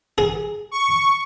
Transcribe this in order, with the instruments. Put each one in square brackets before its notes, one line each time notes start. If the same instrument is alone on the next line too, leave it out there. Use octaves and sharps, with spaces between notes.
[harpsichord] G#4
[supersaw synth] C#6